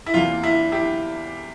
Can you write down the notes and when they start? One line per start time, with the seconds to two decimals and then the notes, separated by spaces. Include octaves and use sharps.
0.06 E4
0.14 E2 C3 E3 A#3 F4
0.43 E4
0.72 E4 G4